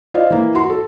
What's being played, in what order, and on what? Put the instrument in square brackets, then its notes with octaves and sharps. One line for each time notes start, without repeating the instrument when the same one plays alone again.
[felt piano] F4 C5 D5 D#5 F5
E3 A#3
F#4 C6
A4